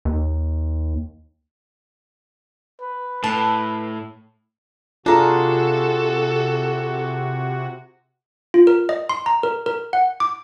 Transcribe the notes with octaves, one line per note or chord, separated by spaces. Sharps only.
D#2
B4
A2 B4 A5
C3 D4 F4 F#4 G#4 A4 A#5
F4
A#4
D#5
C6
A#5
A#4
A#4
F#5
D6